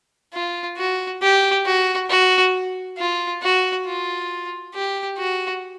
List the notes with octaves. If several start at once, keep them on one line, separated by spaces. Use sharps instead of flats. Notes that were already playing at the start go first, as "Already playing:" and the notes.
F4
F#4
G4
F#4
F#4
F4
F#4
F4
G4
F#4